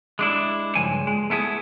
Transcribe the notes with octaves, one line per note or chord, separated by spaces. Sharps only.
G#3 D4 E4
C#2 G2 F3 G#5
G#3
A3 B3 E4 G#4